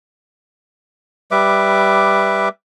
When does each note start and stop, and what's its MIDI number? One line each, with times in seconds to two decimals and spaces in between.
1.31 2.49 55
1.31 2.49 71
1.31 2.49 76
1.31 2.49 86